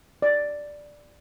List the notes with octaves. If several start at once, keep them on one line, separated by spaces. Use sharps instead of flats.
D5